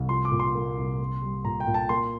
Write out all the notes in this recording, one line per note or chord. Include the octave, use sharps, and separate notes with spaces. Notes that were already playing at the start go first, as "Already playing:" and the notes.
Already playing: C2
F3 C6
D6
A#2
C6
A#3
C2
A#3
G3
A#2 A#5
G5
A#2
A5
A#3 C6